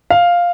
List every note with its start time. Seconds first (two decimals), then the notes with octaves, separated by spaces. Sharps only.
0.10 F5